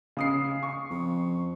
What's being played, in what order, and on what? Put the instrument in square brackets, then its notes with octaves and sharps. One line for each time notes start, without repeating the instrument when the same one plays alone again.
[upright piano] C#3 D#6 C7
C#6
[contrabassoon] F2